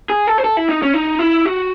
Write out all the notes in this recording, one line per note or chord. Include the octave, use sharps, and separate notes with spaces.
G#4
A4
C5
A4
E4
D#4
C#4
D#4
E4
F#4